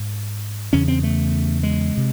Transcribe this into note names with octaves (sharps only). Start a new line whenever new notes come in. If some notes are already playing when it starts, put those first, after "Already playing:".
Already playing: G#2
E2 C#3 C#4
C4
A3
G#3
C3